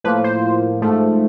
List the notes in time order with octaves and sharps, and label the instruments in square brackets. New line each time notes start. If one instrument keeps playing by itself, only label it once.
[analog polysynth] A2 F3 A#3 B4
C5
G#2 F3 A3